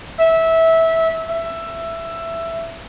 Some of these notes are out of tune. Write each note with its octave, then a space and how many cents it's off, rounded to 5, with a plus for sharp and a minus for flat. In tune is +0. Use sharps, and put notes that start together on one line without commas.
E5 -15
E5 +15